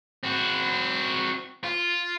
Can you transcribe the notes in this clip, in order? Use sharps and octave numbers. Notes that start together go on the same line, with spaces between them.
C4 F#4
F4